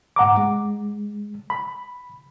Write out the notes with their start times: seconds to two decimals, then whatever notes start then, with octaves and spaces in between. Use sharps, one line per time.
0.16 G#2 F#5 A#5 D6
0.37 G#3
1.50 B5